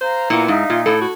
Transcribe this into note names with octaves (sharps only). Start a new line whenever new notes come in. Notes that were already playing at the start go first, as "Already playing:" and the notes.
C5 F5 A#5
A#2 B3 E4
G#2 D#4 E5 F5
A#2 F4
A2 A4
F#4